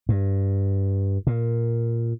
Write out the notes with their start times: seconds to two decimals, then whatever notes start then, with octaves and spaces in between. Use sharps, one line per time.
0.09 G2
1.27 A#2